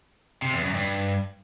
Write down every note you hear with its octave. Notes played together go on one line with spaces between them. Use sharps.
C3
E2
F#2
G2